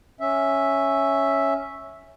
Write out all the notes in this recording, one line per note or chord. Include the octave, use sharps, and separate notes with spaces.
C#4 E5